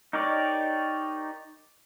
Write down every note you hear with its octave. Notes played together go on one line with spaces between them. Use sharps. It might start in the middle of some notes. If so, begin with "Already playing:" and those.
D#4 G4 A#4 C#5 D5